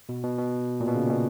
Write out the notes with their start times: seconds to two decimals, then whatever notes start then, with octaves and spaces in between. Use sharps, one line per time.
0.09 B2
0.24 B2
0.38 B2
0.80 A#2
0.88 B2
0.95 C#3
1.06 A#2
1.11 B2